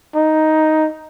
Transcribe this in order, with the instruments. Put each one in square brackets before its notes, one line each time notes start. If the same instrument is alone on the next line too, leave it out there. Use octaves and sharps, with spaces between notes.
[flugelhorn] D#4